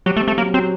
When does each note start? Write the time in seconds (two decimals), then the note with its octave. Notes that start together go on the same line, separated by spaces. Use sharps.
0.06 F#3 G4
0.17 A3
0.22 C4
0.28 A3
0.38 F#3 A#3
0.54 F#3 C4